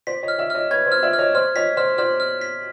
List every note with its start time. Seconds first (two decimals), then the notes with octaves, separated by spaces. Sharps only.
0.07 C5 D5 B6
0.23 C#5 D#5
0.28 F6
0.38 D5 E5
0.50 C#5 D#5 F6
0.71 B4 C#5 G#6
0.86 C5 D5
0.92 F6
1.03 D5 E5
1.13 F6
1.18 C#5 D#5
1.35 C5 D5 F6
1.56 C#5 D#5 B6
1.77 C5 D5 F6
1.98 C5 D5 F6
2.20 F6
2.41 B6